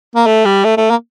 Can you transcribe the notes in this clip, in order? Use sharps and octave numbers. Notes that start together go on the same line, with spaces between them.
A#3
A3
G3
A3
A3
A#3